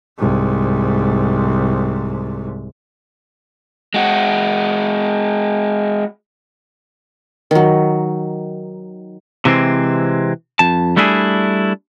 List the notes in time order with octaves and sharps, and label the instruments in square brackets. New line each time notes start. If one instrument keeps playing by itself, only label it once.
[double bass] C2 G#2
[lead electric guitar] G#3 F#4
[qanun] D#3 F#3
[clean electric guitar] C3 E3 G#3 C4
F2 A5
G3 A3 D4 E4 G4 G#4